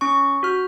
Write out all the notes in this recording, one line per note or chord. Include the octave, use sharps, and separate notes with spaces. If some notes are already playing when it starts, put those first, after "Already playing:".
C#4 C#6
F#4 F6